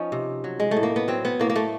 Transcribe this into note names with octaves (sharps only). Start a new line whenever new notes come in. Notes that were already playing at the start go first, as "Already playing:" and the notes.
Already playing: F3 C#4 D#4
C3
F#3
G#3
A3
A2
A#3
B3
F#3 C4
B3
A2 A#3
A#3
A3